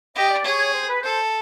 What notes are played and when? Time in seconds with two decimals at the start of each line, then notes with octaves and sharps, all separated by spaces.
0.16 G4 D#5
0.31 D5
0.44 G#4 C#5
0.74 C5
0.89 B4
1.03 A4 C5